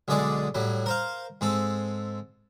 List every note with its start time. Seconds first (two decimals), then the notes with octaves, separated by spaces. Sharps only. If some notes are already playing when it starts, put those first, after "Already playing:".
0.08 B1 D3 G#3 G#4 D5
0.55 A2 F#3 G3
0.86 A#4 C5 F5
1.41 G#2 C4 A4